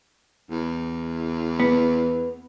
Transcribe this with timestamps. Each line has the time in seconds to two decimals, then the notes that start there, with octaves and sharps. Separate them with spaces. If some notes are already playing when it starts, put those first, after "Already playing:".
0.50 E2
1.60 B3